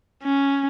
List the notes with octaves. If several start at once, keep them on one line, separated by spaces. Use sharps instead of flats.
C#4